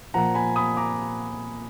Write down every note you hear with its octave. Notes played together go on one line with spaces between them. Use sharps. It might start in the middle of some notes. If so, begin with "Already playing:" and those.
A#2 F3 A#3 F#5 A#5
G#5 B5
B5 D#6
A#5 D6